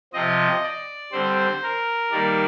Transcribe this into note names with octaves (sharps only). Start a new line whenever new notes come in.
C3 F3 C4 D#5
D5
D3 G3 C4 C5
A#4
D#3 G3 A#3 D5